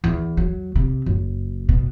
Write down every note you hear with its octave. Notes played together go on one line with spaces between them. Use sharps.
E2
F#3
C3
F#1
B2